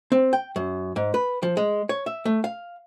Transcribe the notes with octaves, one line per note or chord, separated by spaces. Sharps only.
C4
G5
F#2
G#2
B4
F3
G#3
C#5
E5
A3
F5